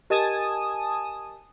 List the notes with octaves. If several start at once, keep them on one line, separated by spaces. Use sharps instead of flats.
G4 A#4 D#5 G#5 A5 D#6